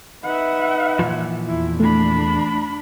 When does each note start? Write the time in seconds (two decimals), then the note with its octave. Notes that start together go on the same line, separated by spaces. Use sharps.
0.24 D#4 B4 E5 F#5
0.99 A#2 E3 F3
1.47 E2 E4
1.80 A3 D4 B5